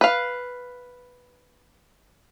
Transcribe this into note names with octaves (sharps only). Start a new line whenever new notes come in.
B4 F5